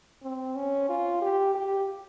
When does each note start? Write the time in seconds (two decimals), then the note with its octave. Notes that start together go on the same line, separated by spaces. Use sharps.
0.23 C4
0.56 C#4
0.89 F4
1.21 G4
1.54 G4